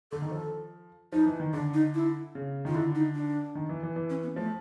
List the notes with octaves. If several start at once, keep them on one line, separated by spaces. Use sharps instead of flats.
D3 A4
D#3
F3
F3 D#4
E3
D#3
D3 D4
D#4
E4
C#3
D#3 F4
D3 E4
D#4
D4
D#3
E3
E3
E3
C#4
B3
F3 A3